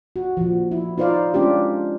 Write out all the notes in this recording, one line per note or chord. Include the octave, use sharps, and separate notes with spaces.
F#4
A#2 F3
E4
D#4 F4 C5 D5 F5
G#3 C#4 D4 F4 G4